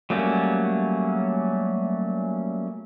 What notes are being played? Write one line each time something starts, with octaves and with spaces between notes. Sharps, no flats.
F#3 G3 A3 A#3 C#4